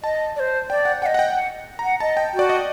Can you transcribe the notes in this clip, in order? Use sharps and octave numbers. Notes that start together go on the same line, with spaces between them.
D#5 A5
D5
C5
D5 G5
F#5
D#5 F#5 G5
F#5
G5
F#5
F#5 A#5
D#5 A5
G5
F#4 D5
D#5